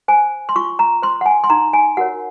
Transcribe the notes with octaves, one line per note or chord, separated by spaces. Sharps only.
C5 G#5
C6
F4 C#6
A#5
C5 C6
F#5
G#5
C6
D#4 A#5
G#5
F#4 A#4 C#5 F#5